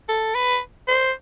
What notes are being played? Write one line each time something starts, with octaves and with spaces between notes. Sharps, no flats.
A4
B4
C5